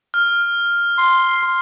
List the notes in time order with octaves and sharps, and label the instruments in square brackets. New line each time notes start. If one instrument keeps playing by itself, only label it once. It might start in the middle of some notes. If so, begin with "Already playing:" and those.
[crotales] F6
[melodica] C6